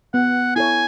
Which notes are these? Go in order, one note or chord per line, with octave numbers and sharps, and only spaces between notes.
B3 F#5
E4 A4 C#5 G#5